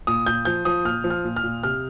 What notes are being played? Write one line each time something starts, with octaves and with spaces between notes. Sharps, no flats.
A#2 D#6
A#2 G6
F3 G6
F3 D#6
A#2 F6
F3
F6
A#2
F6
A#2
C3 F6